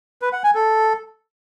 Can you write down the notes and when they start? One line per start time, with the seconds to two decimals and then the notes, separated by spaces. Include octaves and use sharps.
0.22 B4
0.33 F#5
0.44 G#5
0.55 A4